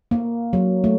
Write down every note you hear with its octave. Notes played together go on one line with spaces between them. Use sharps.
A#3
F#3
A3